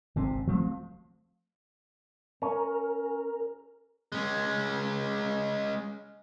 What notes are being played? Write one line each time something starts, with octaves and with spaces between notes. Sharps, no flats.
G#1 C3 C4
F3 A3 C4
C#4 A#4
G#3 C#4